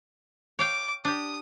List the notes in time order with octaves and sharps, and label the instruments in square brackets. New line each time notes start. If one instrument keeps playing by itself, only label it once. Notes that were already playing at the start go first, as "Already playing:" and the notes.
[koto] C#5 F5 G5 [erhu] D6
[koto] D4 G4 [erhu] D#6